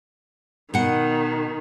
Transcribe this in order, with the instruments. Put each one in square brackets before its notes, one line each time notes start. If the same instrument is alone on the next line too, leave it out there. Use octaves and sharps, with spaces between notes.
[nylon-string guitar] B2 F#5 [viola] D#3